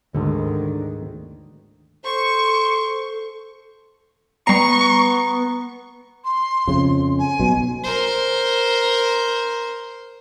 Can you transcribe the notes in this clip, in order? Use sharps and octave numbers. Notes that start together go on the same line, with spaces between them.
D2 G#2 D3 D#3
A4 C5 C#6
G3 B3 A#5 C#6 C7
C6
F2 C#3
G#5
B1 B2
A#4 C5